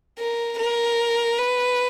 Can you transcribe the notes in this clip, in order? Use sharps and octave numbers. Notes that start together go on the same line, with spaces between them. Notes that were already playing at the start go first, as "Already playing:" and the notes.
A#4
A#4
B4